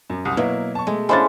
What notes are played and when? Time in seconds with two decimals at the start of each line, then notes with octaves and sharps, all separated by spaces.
0.10 F#2
0.25 C2 D#6
0.37 B2 F#3 A#3 E4
0.75 A5 C#6
0.87 G#3 A3
1.09 G#3 C#4 D4 E4 A4 C5 F5 A6